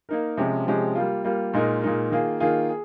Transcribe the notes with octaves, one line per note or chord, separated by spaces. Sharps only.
A#3 D#4 A#4
C3 F3 G#3 C#4 G4
C3 F3 G#3 C#4 G4
G3 A#3 F4
G3 A#3 F4
A#2 G#3 D#4 A#4
A#2 G#3 D#4 A#4
D#3 A#3 F4 G#4
D#3 A#3 F4 G#4
G#4